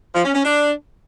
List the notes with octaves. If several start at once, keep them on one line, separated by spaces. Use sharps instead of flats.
F3
C#4
C#4
D4